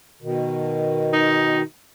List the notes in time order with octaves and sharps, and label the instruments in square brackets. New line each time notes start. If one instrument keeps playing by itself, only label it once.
[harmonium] B2 D#3
[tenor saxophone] D#4